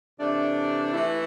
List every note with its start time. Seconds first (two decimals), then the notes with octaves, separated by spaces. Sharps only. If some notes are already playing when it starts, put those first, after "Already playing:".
0.20 C3 E3 A3 D4
0.94 E3 A3 E4